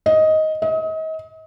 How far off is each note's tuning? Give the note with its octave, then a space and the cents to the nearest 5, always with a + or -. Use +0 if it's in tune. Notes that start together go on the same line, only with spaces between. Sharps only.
D#5 +10
D#5 +35